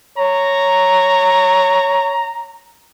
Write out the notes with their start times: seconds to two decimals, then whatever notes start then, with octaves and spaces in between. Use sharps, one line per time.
0.18 C#5 A#5